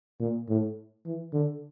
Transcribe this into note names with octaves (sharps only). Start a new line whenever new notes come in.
A#2
A2
E3
D3